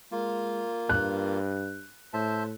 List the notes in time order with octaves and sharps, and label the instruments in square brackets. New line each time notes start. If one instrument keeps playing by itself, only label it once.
[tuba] G#3 [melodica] A#3 F4
[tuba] G2 [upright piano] F#6
[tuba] A2 [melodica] C5 E5 A5